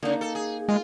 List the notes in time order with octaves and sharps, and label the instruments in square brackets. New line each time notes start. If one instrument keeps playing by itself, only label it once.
[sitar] C#3 [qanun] A#3 D#4
[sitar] A4
G#4
[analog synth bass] G#3 [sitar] F4